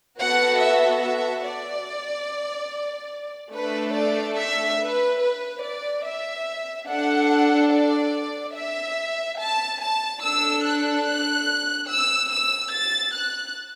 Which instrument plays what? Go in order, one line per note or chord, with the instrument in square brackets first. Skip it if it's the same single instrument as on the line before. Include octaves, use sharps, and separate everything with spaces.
[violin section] B3 F#4 A4 F#5
E5
E5
D5
A3 D4 A4 B4
D5
E5
B4
B4
D5
E5
D4 A4 F#5
D5
E5
A5
A5
D4 A4 E6
F#6
F#6
E6
E6
A6
F#6